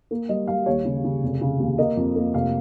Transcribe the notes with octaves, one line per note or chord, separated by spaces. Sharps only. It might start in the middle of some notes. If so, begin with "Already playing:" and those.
A#3
G3 D#5
G3 F5
D#2 C#5
C#3
C#3
F1
C#3
D#2
A#3 D#5
F2
A#3
F1 F5